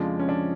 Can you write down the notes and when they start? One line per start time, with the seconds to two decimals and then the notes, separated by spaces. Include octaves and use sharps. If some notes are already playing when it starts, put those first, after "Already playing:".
Already playing: F2 C#3 F3 G#3 D4
0.19 C#4
0.29 D4